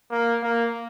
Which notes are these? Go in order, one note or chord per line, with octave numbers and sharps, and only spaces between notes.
A#3
A#3